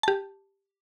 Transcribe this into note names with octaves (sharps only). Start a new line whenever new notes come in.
G4 A5